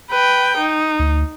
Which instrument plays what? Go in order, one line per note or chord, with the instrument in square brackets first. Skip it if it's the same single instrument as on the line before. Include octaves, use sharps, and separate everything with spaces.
[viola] B4 G5
D#4
[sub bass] D2